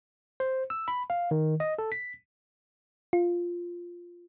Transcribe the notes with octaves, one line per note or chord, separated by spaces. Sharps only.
C5
E6
B5
F5
D#3
D#5
A4
B6
F4